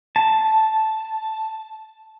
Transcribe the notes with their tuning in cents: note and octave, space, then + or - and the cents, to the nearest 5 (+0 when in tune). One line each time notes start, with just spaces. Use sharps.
A5 -5